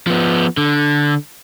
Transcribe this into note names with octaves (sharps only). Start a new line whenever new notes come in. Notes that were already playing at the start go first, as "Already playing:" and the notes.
F3 B3
D3